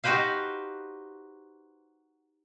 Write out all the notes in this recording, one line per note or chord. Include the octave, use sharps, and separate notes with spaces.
D#4 F#4 G4 B4 C5 F5